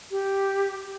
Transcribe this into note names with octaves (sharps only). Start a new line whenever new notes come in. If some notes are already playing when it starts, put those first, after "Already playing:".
G4